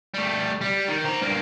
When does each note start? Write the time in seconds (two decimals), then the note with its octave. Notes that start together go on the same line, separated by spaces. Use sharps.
0.14 G3 A3
0.61 G3
0.88 D#3
1.05 C5 A#5
1.22 G2 A#3